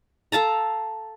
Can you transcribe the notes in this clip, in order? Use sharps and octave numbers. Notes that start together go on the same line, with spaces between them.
A4 F5 A5 A#5